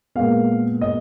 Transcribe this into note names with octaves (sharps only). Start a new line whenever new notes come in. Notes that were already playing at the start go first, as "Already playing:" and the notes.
A#2 G#3 B3 F5
D#5